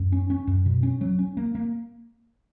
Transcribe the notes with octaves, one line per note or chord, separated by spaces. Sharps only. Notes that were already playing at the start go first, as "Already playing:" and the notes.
Already playing: F#2
C#4
C#4
F#2
B2
C#4
F#3
C#4
A#3
A#3